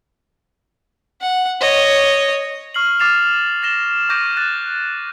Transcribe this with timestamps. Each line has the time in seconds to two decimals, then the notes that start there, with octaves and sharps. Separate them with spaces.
1.21 F#5
1.60 C#5 D#5
2.74 C#6 F6 C7 F#7
3.00 D6 F6 A6 C7 E7 F7
3.63 A6 A#6 E7 G7
4.09 C#6 D6 G6 A#6 D7 D#7
4.37 F#6 A6